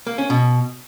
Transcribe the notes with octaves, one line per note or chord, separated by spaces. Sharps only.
A#3
C#4
B2